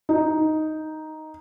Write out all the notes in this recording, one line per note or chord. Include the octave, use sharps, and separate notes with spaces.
D#4